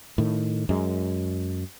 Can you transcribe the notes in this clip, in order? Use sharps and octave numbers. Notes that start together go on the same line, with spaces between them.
A2 D#3
F#2 G#3